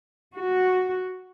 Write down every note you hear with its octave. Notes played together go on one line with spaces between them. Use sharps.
F#4